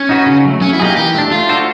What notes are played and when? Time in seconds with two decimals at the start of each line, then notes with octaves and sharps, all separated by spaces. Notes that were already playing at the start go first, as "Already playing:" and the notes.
Already playing: C#4
0.09 D#4 F#4 B4
0.26 C#3
0.44 F#3 A3
0.61 F#3 C#4
0.73 E4
0.79 A#3 D#4 G4 G#4
0.96 E3 G4
1.14 A3 D4
1.31 A3 F4
1.49 D4 F#4 A4 C5